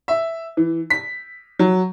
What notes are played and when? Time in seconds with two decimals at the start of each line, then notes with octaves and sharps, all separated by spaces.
0.08 E5
0.57 E3
0.90 B6
1.59 F#3